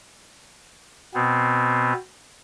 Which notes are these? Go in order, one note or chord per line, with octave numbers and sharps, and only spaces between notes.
B2 B3 C4